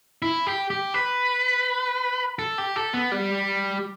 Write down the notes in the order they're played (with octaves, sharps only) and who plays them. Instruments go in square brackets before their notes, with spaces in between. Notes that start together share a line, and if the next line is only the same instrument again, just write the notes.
[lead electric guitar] E4
G4
G4
B4
A4
G4
A4
B3
G3